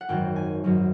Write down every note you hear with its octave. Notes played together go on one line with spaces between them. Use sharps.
F#5
G#1 F#2 D#3 F#3 G5
G#5
G#1 F#2 D#3 F#3